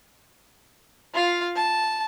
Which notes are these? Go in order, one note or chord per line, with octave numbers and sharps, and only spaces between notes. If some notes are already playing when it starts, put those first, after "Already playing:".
F4 F5
A5